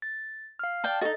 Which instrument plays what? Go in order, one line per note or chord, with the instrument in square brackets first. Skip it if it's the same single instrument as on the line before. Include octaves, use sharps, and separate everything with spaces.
[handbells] A6
F5 F6
[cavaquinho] D5 G5 A5
[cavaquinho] D#4 F#4 [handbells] A4 D#5 A6